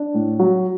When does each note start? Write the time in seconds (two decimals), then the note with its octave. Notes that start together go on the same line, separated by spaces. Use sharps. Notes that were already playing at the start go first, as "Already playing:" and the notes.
Already playing: D4
0.14 A2
0.39 F#3